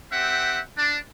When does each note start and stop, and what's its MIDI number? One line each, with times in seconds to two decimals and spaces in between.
0.12 0.60 60
0.12 0.60 67
0.12 0.60 76
0.12 0.60 78
0.78 0.99 62